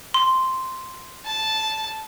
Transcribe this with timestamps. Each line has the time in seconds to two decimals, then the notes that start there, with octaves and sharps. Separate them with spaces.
0.14 C6
1.26 A5